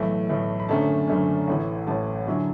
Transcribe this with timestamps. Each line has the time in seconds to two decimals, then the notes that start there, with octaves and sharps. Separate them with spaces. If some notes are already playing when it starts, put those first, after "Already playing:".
Already playing: B1 A2 E3 A3
0.29 B1 A2 E3 A3
0.60 B5
0.68 F#1 F#2 D3 A3 C#4 A5
1.08 F#1 F#2 D3 A3 C#4
1.47 A1 A2 E3
1.87 A1 A2 E3 A5
2.27 F#2 D3 F#3 C#4 E4